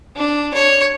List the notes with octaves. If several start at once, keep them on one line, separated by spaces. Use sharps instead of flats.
D4
C#5